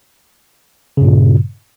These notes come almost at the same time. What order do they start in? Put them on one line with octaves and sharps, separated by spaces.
C#3 G2 A#2